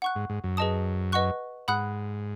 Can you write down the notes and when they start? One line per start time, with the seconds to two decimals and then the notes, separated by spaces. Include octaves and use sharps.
0.02 F#5 C#6 F#6
0.16 G#2
0.30 G#2
0.44 F#2
0.57 G#4 B4 D#5 A5 D#6
1.12 B4 D#5 F#5 C#6 F#6
1.68 G#2 F#5 B5 D#6 F#6